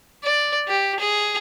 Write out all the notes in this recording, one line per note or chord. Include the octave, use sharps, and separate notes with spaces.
D5
G4
G#4